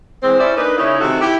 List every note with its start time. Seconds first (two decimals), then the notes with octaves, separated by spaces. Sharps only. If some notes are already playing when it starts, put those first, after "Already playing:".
0.22 E3 G#3 C4
0.39 C#4 E4 G4 C5 D5
0.56 A#3 D4 D#4 B4
0.77 C#3 C#4 D#4 E4
1.00 C3 D#3 A3 F#4 A4
1.20 E4 G4